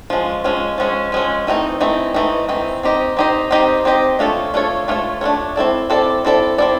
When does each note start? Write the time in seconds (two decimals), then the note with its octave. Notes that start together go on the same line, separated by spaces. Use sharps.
0.10 F3 G#3 C#4
0.44 F3 G#3 C#4
0.78 F3 G#3 C#4
1.12 F3 G#3 C#4
1.47 E3 A3 C4 D#4
1.81 E3 A3 C4 D#4
2.14 E3 A3 C4 D#4
2.49 E3 A3 C4 D#4
2.83 C4 D#4 G4 C5 D#5
3.17 C4 D#4 G4 C5 D#5
3.51 C4 D#4 G4 C5 D#5
3.85 C4 D#4 G4 C5 D#5
4.19 A3 D4 F4 A4 C#5
4.54 A3 D4 F4 A4 C#5
4.88 A3 D4 F4 A4 C#5
5.21 A3 D4 F4 A4 C#5
5.56 C4 E4 A4 D5
5.90 C4 E4 A4 D5
6.25 C4 E4 A4 D5
6.58 C4 E4 A4 D5